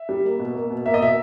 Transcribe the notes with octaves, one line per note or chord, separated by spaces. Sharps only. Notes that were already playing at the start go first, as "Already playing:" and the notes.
Already playing: E5
G3
A#3
B2
A#3
B2
A#3 E5
D#5
B2 E5